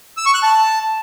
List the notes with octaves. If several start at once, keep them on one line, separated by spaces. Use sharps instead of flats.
E6
C#6
F#6
A5